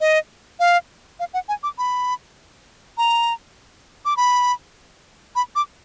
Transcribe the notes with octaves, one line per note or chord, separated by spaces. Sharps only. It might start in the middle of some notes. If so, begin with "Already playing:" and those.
D#5
F5
F5
F#5
G#5
D6
B5
A#5
D6
B5
B5
D6